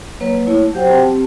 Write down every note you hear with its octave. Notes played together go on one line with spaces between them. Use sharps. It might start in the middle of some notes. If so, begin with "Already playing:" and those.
F#3 A#3 B4 C#5
A3 E4 C#5
F#3 F#4 G4 C5 F#5 G5
C4 G4 A5